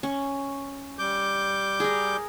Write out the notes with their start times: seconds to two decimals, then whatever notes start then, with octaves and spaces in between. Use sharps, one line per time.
0.03 C#4
0.99 G3 D6 G6
1.80 G#4 A#4